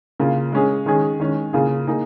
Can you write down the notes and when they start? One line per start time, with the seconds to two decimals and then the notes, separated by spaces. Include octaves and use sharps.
0.20 C#3 A#3 F4
0.52 G#3 C#4 G#4
0.86 D#3 G#3 C#4 G#4
1.20 D#3 G#3 C#4
1.53 C#3 A#3 F4 G#4
1.87 A#3 D#4 G#4